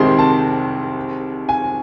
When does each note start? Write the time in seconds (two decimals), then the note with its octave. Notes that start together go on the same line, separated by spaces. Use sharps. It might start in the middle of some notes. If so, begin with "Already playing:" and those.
Already playing: C2 C3 D#3 G#3 C4 C6
0.19 A5
1.49 G#5